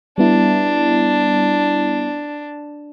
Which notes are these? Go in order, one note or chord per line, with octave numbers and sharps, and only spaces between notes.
G3 B3 D4 E4